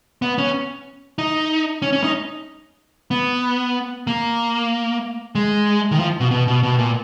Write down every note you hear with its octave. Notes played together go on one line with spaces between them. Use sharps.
B3
C#4
D#4
C#4
C#4
D#4
B3
A#3
G#3
D#3
F3
B2
B2
B2
B2
A#2